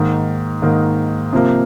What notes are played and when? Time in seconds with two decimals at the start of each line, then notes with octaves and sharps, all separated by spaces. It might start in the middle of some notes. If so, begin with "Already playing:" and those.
Already playing: G#2 D#3 A#3
0.62 G#2 D#3 A#3
1.33 C3 F3 A#3